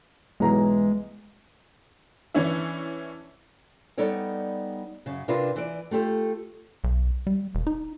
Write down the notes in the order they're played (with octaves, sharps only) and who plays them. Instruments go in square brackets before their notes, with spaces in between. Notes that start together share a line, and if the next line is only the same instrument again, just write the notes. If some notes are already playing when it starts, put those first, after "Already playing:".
[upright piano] B1 E3 A#5 [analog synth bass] G#3
[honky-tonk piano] E3 C#4 D4 E4
[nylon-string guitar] G3 B3 D#4 A4 C#5 D5
F#2 C#3
C3 D4 E4 F4 A#4 B4
E3 D5
A3 F4 G4 A4
[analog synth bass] B1
G3
E1
D#4